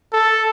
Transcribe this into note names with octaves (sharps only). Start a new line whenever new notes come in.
A4